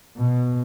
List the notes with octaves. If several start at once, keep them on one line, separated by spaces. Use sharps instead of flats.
B2